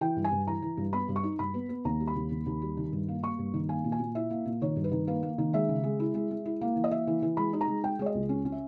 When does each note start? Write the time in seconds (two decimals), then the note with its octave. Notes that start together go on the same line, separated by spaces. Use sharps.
0.01 E3 G5
0.16 G2
0.24 G#5
0.32 G2
0.47 E3 A#5
0.62 E3
0.77 G2
0.93 B3 B5
1.09 G2
1.16 C#6
1.23 D#4
1.39 G2 B5
1.54 B3
1.69 B3
1.85 D#2 A#5
2.00 G3
2.07 B5
2.16 D#2
2.31 D#2
2.46 D#2
2.62 G3
2.77 D#3
2.92 G2
3.08 A#3
3.23 A#3 C#6
3.39 G2
3.54 D#3
3.69 A#3 G#5
3.84 A#2
3.92 G#5
4.00 A#2
4.15 E4 E5
4.31 A#3
4.46 A#2
4.62 D#3 C#5
4.76 G2
4.84 B4
4.92 D#3
5.07 A#3 B4
5.23 A#3
5.38 D#3
5.53 G#3 E5
5.69 C#3
5.84 G#3
6.00 E4
6.14 G#3
6.31 G#3
6.45 E4
6.61 A#3
6.76 E3
6.84 D#5
6.91 A#3 E5
7.07 E3
7.22 E3
7.37 G#3 B5
7.53 D#4
7.61 A#5
7.68 G#3
7.83 G#3 G5
7.99 G#3 C#5
8.06 D#5
8.15 C#2
8.29 C#4
8.45 C#4
8.52 E5